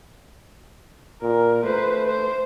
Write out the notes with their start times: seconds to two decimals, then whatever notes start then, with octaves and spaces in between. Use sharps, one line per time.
1.22 A#2 A#4
1.64 A3 B4 C5
2.07 C5